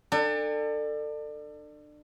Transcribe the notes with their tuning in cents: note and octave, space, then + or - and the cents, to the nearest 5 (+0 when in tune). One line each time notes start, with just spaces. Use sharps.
D4 +30 A4 +30 G5 +45